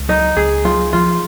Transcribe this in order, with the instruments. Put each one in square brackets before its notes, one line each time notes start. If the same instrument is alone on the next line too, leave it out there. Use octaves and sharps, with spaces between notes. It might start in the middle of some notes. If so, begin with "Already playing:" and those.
Already playing: [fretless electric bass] C#2
[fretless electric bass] F#3 [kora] D#4
[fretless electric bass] C#2 [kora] G#4
[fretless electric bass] F#3 [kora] F4
[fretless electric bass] F3 [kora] F4